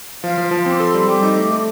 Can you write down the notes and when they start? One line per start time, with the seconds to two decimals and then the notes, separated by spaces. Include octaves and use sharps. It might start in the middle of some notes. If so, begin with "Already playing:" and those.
0.23 F3 F5
0.38 F3
0.51 F3 A5
0.61 C6
0.66 C4 D6
0.80 A4 C6
0.94 G3
1.08 G3 D6
1.22 D#4
1.36 A3
1.51 A3